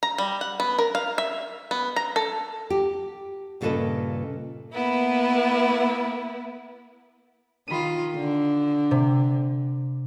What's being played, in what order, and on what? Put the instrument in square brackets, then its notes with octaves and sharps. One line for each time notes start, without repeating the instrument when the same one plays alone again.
[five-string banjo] A#5
G3
F#5
B3
A#4
F5
E5
B3
A#5
A4
[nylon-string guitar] G4
G2 A#2 C#3 A4 B4 D#5
[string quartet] A#3 B3 E4
[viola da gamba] D#3 F4 [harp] B5 D#7
[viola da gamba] D3
[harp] C3